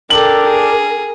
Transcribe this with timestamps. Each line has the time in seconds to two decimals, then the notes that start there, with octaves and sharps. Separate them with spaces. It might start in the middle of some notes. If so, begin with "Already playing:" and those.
0.10 D4 G4 A4 A#4 F#7
0.47 G#4